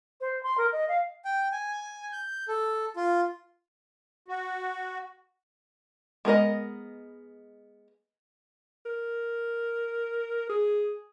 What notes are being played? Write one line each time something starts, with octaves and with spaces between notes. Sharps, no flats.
C5
C6
A#4
D#5
F5
G5
G#5
G6
A4
F4
F#4
G#3 B3 A#4 D#5
A#4
G#4